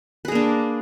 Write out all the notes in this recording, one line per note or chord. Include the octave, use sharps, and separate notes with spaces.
A#3 D4 G#4 B4